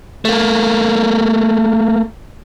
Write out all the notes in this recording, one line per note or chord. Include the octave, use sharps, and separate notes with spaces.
A3 A#3